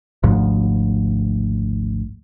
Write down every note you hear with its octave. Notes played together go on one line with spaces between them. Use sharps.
G#1 D2 G#2 F3